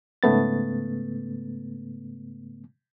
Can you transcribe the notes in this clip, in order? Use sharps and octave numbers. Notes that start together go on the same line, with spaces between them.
G#2 C#3 A3 B3 A6